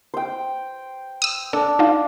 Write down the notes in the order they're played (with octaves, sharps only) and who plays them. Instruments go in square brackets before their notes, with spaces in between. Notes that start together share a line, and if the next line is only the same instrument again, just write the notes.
[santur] C5 G5
[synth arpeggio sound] D#6 E6
[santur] D4 [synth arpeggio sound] A4
[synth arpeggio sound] D#4 F4